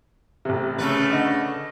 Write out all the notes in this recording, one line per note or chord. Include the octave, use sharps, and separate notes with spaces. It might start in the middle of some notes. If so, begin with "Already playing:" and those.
A1 C3
C#3 A3 B4
D3 D#5